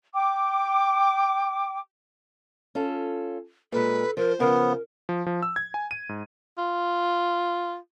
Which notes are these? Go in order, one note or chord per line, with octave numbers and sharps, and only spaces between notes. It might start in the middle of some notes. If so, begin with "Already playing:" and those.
G5 D6
C#4 F4 A4
A#2 G#3 A4 B4
F3 A#4 C5
C#3 F3 B3 A#4
F3
F3
E6
G#6
G#5
D#7
G#2
F4